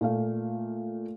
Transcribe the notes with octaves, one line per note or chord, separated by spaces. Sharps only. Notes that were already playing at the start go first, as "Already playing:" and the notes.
A#2 A3 F5